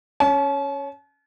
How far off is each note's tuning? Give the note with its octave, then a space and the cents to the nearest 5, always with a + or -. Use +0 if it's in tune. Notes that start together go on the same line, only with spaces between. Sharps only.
C#4 +0 A5 -45